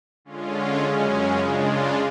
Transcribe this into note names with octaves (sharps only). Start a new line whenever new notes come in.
D3 G#3 C#4 F4
F#2 C#3 G#3 C#4
C#3 G#3 D4 F4